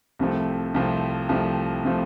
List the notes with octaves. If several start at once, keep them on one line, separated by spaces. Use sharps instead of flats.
C2 C3 F3 A3
C2 C3 F3 A3
C2 C3 F3 A3
C3 F3 A3